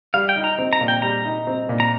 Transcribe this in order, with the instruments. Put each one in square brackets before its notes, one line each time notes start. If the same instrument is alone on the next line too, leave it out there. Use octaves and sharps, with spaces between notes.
[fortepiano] G3 [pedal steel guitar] F5
[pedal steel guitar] G5
[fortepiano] D#4
[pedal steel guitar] A#5
[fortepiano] C4
[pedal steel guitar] A#5
[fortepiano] A#2
[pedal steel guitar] G5
[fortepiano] G3 [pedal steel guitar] A#5
[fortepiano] D#4
C4
A#2
[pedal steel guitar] A#5